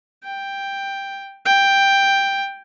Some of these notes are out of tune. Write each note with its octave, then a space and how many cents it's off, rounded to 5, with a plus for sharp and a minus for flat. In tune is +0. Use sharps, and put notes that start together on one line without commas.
G5 +5
G5 +5